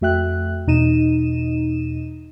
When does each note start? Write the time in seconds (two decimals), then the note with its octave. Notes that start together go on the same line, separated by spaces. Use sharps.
0.01 F2 A3 F#4 E5 G5 F#6
0.67 E2 B2 D#4 D#5 D#7 E7